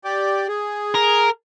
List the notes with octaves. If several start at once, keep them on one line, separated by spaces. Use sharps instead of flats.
G4 D5
G#4
A#4